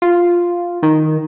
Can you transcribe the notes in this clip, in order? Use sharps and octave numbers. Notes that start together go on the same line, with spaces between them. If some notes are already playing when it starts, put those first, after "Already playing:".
F4
D#3